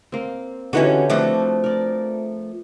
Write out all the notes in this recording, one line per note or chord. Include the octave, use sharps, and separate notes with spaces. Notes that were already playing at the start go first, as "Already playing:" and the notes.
A#3 C4
D3 E3 C#4 D#4 F#4 G4
F3 A3 C4 D4 F#4 B4
A#4 D5